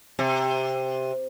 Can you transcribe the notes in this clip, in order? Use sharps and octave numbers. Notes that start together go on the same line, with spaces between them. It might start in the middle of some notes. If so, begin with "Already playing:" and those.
C3